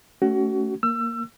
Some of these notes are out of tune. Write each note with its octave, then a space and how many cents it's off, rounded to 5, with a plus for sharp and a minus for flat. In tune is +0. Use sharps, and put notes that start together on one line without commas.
A3 +0 C#4 +20 F#4 +30
A#3 +0 E6 +30